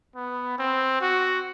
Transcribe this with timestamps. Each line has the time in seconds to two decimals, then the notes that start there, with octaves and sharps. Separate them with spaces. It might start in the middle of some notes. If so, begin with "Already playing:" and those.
0.15 B3
0.58 C4
1.01 F#4